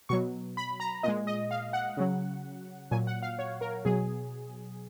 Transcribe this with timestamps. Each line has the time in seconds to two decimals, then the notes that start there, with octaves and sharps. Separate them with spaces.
0.09 B2 F#3 C#6
0.57 B5
0.80 A#5
1.03 A#2 G#3 D#5
1.27 D#5
1.51 F5
1.73 F#5
1.97 C#3 F#3
2.91 A#2 F#3 G#5
3.07 F#5
3.22 F5
3.39 C#5
3.61 A#4
3.85 B2 F#3 G#4